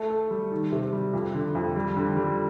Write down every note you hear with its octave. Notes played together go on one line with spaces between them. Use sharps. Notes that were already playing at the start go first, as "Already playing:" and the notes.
Already playing: A3 A4
A4
G3
D#3
C3
G3
F2
D3
F2
G3
D3
G3